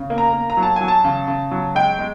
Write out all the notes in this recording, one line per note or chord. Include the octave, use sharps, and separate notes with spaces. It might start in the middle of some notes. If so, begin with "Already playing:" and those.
Already playing: C#3
A#3
A#5
A#3
A#5
F#3
A5
F#3 G#5
A5
C#3
C#3
F#3
G#3 G5
G#3